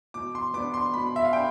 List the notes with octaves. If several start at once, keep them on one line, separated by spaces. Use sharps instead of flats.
B2 D6
C6
B3 D4 D6
C6
B2 B5
E5
F5
D4 G5